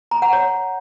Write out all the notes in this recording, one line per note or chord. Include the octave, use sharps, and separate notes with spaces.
A#5
F#5
C#5